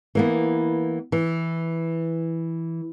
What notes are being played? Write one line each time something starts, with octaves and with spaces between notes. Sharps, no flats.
E3 A#3 B3
E3